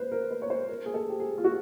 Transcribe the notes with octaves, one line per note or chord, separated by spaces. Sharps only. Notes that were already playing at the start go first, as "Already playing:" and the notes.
Already playing: B4 C5
A#4
B4
C#5
C5
A#4
G#4
A4
G4
G#4
F4
F#4